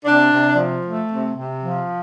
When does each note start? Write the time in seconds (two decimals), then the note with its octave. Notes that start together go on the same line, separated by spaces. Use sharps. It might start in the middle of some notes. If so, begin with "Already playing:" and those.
0.05 C3 D4
0.31 C3
0.57 F3
0.84 A3
1.10 C3
1.36 C3
1.62 F3